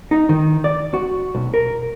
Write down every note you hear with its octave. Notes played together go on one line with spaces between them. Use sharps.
D#4
D#3
D5
F#4
B1
A#4